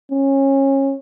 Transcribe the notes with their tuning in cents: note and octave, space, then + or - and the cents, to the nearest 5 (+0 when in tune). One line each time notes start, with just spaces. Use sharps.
C#4 -25